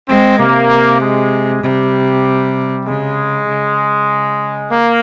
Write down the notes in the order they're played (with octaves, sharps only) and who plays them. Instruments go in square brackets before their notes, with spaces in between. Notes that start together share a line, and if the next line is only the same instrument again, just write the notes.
[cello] G#3 [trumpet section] C4
[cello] C3 [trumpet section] A#3
[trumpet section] G#3
[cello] C3 [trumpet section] G3
[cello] C#3 [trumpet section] G#3
[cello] C#3
[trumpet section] A#3